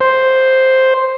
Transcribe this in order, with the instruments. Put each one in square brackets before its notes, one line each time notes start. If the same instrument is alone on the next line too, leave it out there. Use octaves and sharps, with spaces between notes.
[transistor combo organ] C5